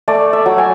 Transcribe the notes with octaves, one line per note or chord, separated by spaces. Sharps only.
A3 D5
E5
F#3
G#5